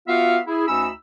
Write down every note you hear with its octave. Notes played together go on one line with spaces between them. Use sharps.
B3 F4 F#4 E5 F5
E4 G#4
D2 C#4 D#4 B5 E6